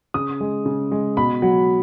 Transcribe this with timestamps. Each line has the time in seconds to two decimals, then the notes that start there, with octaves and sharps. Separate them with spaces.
0.14 C#3 D#6
0.40 G#3
0.66 C#3
0.92 G#3
1.17 B2 B5
1.42 F#3